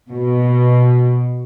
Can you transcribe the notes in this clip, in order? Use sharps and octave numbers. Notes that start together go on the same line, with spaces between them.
B2